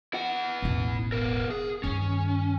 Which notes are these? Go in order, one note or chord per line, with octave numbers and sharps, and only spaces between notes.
E4 F#5
E1 A1
B3 A#4
G#4
G2 D#3 C#4